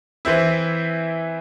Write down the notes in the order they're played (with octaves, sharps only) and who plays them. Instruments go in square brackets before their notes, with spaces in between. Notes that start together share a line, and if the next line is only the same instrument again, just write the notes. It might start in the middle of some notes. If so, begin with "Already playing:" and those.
[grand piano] E3 C4 E4